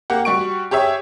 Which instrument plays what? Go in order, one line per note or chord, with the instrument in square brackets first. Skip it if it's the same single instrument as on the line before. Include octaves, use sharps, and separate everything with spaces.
[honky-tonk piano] A#3 G4 F#5
G3 F#4 C#6 D7
G4 G#4 C#5 E5